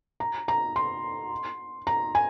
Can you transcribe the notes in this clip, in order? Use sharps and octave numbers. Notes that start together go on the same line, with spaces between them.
A#5
A#5
C6
A#5
G#5